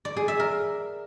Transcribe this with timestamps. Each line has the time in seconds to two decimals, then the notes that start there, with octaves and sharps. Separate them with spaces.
0.05 D5
0.17 G#4
0.28 E5
0.40 A#4